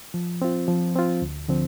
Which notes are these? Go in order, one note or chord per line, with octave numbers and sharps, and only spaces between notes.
F3
C4 F4
F3
C4 F4
D2
D3 F3 C4